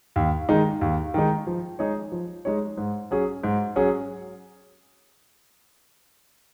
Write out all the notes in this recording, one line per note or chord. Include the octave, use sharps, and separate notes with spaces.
D#2
D#3 G#3 D#4
D#2
D#3 G#3 D#4
F3
G#3 D#4 G#4 C#5
F3
G#3 D#4 G#4 C#5
G#2
F#3 C#4 G#4
G#2
F#3 C#4 G#4